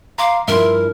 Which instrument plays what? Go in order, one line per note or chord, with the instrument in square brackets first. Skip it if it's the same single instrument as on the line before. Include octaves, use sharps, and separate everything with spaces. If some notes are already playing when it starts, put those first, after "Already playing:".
[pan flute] F5 [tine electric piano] A#5 C6 D6
[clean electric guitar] G2 F3 E4 [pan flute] A#4 [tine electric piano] E5 C6